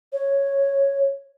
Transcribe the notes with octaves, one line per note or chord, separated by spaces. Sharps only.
C#5